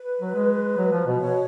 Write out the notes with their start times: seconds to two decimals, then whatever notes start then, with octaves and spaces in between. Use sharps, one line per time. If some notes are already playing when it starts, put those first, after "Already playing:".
Already playing: B4
0.21 F#3
0.35 G#3
0.78 F#3
0.92 F3
1.07 B2
1.20 B2 C#5